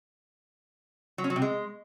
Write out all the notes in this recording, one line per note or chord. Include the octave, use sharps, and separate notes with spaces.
F#3
C#4
F#3
C3
G#3